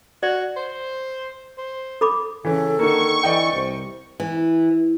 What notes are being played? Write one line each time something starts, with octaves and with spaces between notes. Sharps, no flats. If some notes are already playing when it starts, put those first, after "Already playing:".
F#4 D5
C5
C5
A4 B5 D6
C#3 E3 C#4 A4
D3 D#3 A#3 C#6
E3 D5 D#5 G5
C2 C5
E3